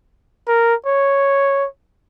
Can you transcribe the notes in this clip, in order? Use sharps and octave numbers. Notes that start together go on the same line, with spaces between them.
A#4
C#5